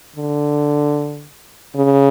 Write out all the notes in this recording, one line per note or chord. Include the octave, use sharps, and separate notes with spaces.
D3
C#3